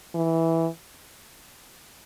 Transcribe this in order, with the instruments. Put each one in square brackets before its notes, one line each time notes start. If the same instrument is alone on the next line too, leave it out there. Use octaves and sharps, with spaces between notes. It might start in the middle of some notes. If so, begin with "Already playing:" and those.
[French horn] E3